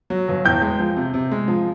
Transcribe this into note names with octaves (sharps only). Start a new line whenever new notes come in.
F#3
G1
E2 G5 G6
G#3
F3
C3
C3
G#3
F3